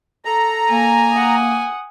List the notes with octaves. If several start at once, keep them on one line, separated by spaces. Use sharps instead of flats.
A4 A#5
A#3 G#5
F#5 D#6